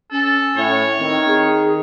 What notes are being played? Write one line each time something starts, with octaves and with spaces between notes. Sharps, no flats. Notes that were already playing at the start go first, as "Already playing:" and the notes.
C#4 A4
A2 C#5
D#3 C4
G#4